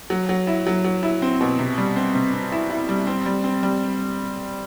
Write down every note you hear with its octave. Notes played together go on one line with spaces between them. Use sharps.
F#3
F#3
E4
F#3
F#3
E4
C4
B2
C3
G3
C4
C3
C4
E4
E4
G3
C4
G3
C4
G3